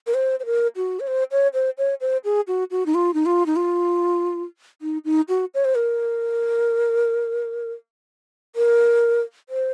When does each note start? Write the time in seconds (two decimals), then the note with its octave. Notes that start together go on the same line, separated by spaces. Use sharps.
0.07 A#4
0.14 C5
0.40 C5
0.46 A#4
0.76 F#4
1.00 C#5
1.07 C5
1.31 C#5
1.54 C5
1.78 C#5
2.01 C5
2.25 G#4
2.48 F#4
2.71 F#4
2.86 D#4
2.95 F4
3.14 D#4
3.26 F4
3.46 D#4
3.56 F4
4.82 D#4
5.05 D#4
5.29 F#4
5.54 C#5
5.65 C5
5.75 A#4
8.56 A#4
9.49 C5